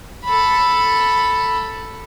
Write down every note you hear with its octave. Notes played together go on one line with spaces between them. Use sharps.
A4 B5